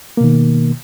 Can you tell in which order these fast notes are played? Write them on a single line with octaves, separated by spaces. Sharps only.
A#3 B2 D#3